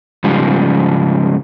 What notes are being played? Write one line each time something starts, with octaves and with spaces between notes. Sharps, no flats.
G#2 C#3 F3 G3